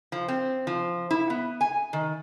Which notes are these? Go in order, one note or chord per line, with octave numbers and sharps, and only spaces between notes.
F3
C4
F3
E4
B3
G#5
D#3